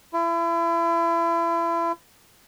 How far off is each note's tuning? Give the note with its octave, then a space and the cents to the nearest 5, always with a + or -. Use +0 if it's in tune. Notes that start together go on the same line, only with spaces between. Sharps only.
E4 +35